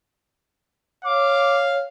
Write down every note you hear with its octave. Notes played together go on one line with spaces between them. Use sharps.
C#5 F5 D6